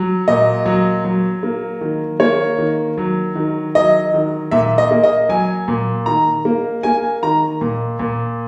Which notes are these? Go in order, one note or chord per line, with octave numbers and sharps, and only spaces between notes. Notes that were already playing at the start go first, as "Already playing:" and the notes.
Already playing: F#3
A#2 D#5
F#3
F#3
A#3
D#3
A#3 C#5
D#3
F#3
D#3
F#3 D#5
D#3
A#2 E5
D#5
A#3
D#5
F#3 G#5
A#2
D#3 A#5
A#3
A#3 G#5
D#3 A#5
A#2
A#2